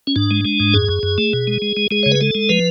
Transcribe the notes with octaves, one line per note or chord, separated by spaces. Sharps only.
C#4
G#2 D4
G#3
G#3
G#2
F#2 G#4
F#2
F#2
A3
B2
G#3
G#3
G#3
G#3 G#4
C#3 C#5
B4
G#3 A4
G#3
F3 B4